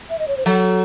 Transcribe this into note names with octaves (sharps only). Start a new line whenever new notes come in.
E5
D#5
C#5
C5
F#3 A4